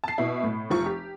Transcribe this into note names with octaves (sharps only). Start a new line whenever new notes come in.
A5 C7
B2 E4
A2
F1 F3 C#6
G4